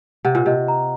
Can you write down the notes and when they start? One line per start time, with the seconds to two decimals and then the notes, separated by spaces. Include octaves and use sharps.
0.25 C3 F#5
0.35 A#2
0.46 C3 D#5
0.68 A#5